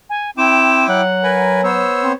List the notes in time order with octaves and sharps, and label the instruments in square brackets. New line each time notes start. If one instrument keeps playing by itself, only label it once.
[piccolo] G#5
[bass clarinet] C4 [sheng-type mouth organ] E4 G5 D6 [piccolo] E7
[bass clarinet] F#3 [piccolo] F#5
[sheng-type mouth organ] A#4 B4 G#5
[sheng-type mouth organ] B3 C5 C#5 [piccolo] E6
[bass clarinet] C4